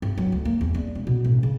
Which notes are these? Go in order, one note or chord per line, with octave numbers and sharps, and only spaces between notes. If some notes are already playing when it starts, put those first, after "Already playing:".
G2
F#3
D2
A#3
E2
D4
E1
B2
A1
C#3